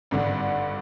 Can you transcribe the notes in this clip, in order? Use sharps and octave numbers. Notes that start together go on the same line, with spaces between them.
G#1 G2 D3